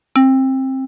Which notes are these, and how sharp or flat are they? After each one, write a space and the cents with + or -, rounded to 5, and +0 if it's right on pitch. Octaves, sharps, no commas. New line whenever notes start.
C4 +20